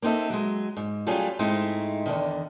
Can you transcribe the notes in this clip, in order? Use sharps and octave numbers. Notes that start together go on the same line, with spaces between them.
A#3 C4 D#4 A4 E5
F#3 G#3
G#2
F#3 G3 A3 C#4 F4 G#4
G#2 G#3 A3 C4 D#4 E4
E2 D3 D#3